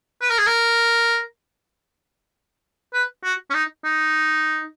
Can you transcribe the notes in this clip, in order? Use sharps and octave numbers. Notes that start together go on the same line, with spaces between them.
B4
A#4
G#4
A#4
B4
F#4
C#4
D#4
D#4